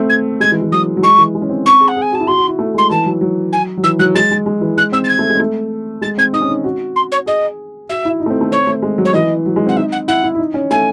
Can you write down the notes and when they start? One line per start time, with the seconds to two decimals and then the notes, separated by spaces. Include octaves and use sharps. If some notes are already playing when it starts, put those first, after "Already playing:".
Already playing: A3 C4
0.09 G#6
0.40 G#3 G#6
0.52 E3
0.62 E3
0.72 F#3 D#6
0.97 F#3
1.02 G#3 C#6
1.18 E3
1.35 G#3
1.42 C#4
1.50 C4
1.65 C4 C#6
1.81 G#4
1.88 F#5
1.97 G#4 G#5
2.12 F#4 A5
2.20 E4
2.27 F#4 C6
2.38 F#4
2.48 E4
2.59 A3
2.75 G#3 C6
2.90 E3 A5
3.06 F#3
3.21 F#3
3.52 G#5
3.77 F#3
3.83 E3 E6
3.99 F#3 F#6
4.15 G#3 A6
4.31 G#3
4.46 G#3
4.61 E3
4.77 G#3 F#6
4.92 C4 E6
5.04 A6
5.09 G#6
5.19 A3
5.29 G#3
5.35 C4
5.40 A3
6.01 G#3 A6
6.18 C4 G#6
6.33 D#4 D#6
6.41 C#4
6.49 D#4
6.64 F#4
6.96 C6
7.11 C#5
7.26 G#4 D#5
7.89 F#4 E5
8.05 E4
8.20 D#4
8.26 A3
8.30 C4
8.41 A3
8.51 C4 C#5
8.67 A3
8.82 G#3
8.98 F#3
9.05 C#5
9.14 E3 D#5
9.46 F#3
9.56 G#3
9.67 C4 F#5
9.76 D#4 E5
9.92 F#5
10.08 E4 F#5
10.24 E4
10.35 E4
10.38 D#4
10.54 C#4
10.70 A3 G#5